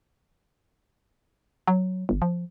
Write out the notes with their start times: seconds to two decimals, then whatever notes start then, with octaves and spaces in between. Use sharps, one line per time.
1.68 F#3
2.09 G1
2.22 F3